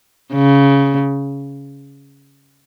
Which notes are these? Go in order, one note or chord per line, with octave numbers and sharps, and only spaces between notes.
C#3